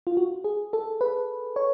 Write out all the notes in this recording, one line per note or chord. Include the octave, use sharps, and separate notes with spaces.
F4
F#4
G#4
A4
B4
C#5